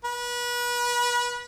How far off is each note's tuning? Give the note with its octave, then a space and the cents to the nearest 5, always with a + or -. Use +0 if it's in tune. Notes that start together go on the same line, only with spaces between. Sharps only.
B4 -30